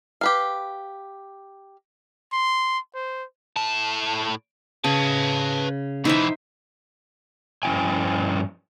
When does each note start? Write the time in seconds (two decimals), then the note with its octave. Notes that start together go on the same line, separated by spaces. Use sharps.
0.21 G4 B4 F5
2.32 C6
2.94 C5
3.56 A2 A5
4.84 C#3 B4 A5
6.05 B2 E3 D#4 C5 E5
7.63 G2 F3 C#4 E4 G5 G#5